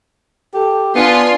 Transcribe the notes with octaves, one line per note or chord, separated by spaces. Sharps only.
G4 A4
B3 D4 F4 G#5 C6